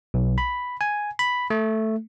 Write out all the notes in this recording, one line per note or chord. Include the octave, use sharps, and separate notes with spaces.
B1
B5
G#5
B5
A3